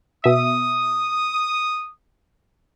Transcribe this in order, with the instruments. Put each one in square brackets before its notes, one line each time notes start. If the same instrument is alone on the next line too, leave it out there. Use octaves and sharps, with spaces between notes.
[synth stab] B2 E5 [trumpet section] D#6